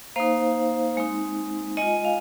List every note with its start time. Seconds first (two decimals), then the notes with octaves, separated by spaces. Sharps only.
0.16 A#3 D#4 C5 F5
0.97 G#3 C4 D#4
1.77 G#3 D#5 G#5
1.82 F4
2.05 F5